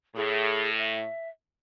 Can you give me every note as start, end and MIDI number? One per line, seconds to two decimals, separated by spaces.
0.16 1.05 45
0.16 0.69 68
0.77 1.29 76